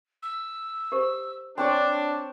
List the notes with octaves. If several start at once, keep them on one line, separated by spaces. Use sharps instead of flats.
E6
G4 A#4 C5
C4 D4 C#5 A5